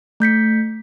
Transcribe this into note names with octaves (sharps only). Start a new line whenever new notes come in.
A3 G6 B6 C#7